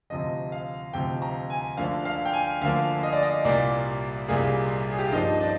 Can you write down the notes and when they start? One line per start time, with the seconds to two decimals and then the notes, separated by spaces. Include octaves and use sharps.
0.10 D2 C3 F3 D#5
0.52 F5
0.93 D2 C3 F3 G5
1.22 A#5
1.50 G#5
1.77 D2 D3 F3 A#3 F5
2.05 F5
2.25 G5
2.33 G#5
2.61 D2 D3 F3 A#3 F5
3.03 D#5
3.13 D5
3.23 D#5
3.45 C2 A#2 G3 A#3 D5
4.28 C2 A#2 G3 A#3 G#4
4.91 G#4
4.98 G4
5.05 F4
5.12 G2 F3 A#3 D#4
5.40 D4